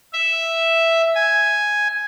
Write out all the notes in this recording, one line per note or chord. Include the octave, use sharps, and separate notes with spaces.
E5
G#5